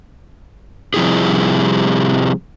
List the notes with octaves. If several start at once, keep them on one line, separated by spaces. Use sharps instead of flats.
C3 F3 G3 E4 G4 G#4